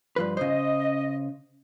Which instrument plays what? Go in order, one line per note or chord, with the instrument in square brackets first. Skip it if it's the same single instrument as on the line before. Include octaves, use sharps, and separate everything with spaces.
[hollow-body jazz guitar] G2 F3 B4
[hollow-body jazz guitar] C#3 C5 [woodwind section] D#5